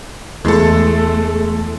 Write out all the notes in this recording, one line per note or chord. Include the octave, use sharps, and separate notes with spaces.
E2 G#3 A3 A4